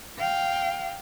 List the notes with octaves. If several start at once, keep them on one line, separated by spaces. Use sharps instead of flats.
F5 G5